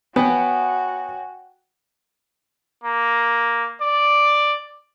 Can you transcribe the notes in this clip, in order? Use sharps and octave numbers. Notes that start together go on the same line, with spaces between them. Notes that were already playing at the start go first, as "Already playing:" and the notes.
B3 F#4 C#5 G5 G#5
A#3
D5